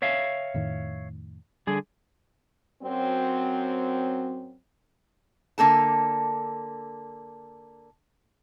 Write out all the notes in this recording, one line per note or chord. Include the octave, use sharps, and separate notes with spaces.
C#5 E5 F5
F2 A2 D#3
D3 G3 G#4
F#2 F#3 C4
D3 A#3 A4 A5